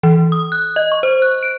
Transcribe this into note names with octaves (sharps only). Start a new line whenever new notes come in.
E3
D#6
F#6
D#5
C#6
C5
F#6
D7